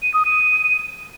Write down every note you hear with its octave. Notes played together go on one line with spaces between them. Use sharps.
D#7
D#6
D#7